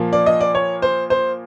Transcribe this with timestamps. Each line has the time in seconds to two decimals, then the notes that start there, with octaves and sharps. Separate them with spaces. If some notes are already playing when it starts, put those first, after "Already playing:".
Already playing: A#2 F3 A#3
0.13 D5
0.26 D#5
0.41 D5
0.55 C#5
0.82 C5
1.10 C5